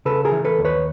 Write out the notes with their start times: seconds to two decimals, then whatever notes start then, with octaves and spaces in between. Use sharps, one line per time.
0.05 C#3 A4 B4
0.25 G#4 A#4
0.32 E3
0.45 A4 B4
0.59 D#2
0.65 B4 C#5